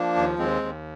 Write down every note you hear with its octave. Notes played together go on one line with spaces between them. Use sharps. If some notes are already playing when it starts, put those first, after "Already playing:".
Already playing: F3 A#3 D4
D#2
D#2 G#3 C4
D#2